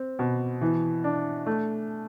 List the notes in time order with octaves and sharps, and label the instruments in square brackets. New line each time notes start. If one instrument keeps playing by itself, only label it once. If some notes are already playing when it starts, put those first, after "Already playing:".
Already playing: [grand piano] C4
B2
E3
D4
A3